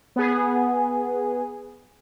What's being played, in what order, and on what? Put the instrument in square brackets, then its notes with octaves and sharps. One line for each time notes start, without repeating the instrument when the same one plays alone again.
[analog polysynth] B3 G#4